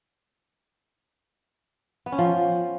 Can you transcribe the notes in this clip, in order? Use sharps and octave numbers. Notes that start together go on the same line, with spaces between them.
B3
C#4
F3